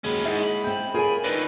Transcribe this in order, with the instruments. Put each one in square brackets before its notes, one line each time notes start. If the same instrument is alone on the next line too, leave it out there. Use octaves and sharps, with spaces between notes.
[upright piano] D#2 F#3 [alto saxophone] G#3 [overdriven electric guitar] C#4 B4
[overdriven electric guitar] G#2 [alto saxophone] G#3 [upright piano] E4 F#5
[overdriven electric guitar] B5
[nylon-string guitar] C4 E4 [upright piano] G5 G6
[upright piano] F4 C#5 [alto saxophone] G#4 [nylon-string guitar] A#4 G#5
[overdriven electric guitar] D3 D#3 [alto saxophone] B4 [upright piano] A#6 D7 D#7